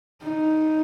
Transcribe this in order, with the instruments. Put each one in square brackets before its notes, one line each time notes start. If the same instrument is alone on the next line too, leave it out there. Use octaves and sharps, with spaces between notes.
[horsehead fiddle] D#4